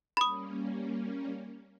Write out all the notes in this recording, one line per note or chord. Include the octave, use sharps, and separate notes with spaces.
G3 A#3 C#4 B5 D#6